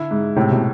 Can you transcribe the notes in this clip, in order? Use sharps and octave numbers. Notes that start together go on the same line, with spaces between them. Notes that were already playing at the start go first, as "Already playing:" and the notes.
Already playing: D3 E4
G#2
A2 C3
B2